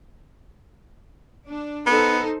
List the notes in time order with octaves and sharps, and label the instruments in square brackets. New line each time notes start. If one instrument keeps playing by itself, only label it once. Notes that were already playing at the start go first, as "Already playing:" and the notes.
[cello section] D4
[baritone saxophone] B3 [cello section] D#4 A4 C5